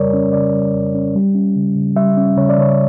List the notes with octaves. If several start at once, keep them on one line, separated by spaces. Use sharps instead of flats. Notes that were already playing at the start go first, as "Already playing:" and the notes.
Already playing: F2 C#3 G3 A#4 C#5 D5
C#4
C#3 D5
G3
F2
C#4
G3
C#4
C#3
C#3
G3 E5
C#4
C#3 C#5
D5
C#3 C#5